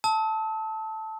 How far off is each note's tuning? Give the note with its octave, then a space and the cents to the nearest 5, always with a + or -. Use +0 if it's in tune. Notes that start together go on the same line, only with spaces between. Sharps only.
A5 +0 E6 -45